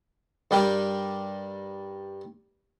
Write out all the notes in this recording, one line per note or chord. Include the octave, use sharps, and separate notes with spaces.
G2 G3 G4 A#4 D5